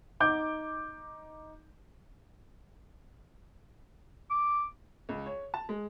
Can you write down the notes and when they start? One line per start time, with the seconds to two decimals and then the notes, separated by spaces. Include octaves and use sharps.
0.20 D#4 D6 G6
4.30 D6
5.09 C#2
5.26 C#5
5.54 A5
5.69 G#3